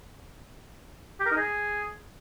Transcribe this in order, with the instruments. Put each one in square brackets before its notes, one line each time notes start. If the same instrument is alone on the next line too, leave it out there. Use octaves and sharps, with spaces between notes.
[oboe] G4
A#4
D#4
G#4